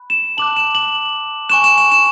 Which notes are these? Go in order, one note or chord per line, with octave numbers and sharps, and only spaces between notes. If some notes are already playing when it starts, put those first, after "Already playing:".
Already playing: B5 F#6
E7
A5 D6 F#6 F#7
E7
F#7
G#5 C#6 F#6 E7
E7
E7
E7